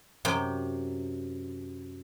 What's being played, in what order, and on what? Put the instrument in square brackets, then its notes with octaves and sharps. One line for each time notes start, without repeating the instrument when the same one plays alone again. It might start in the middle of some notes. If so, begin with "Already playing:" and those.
[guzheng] F#2 C3 G5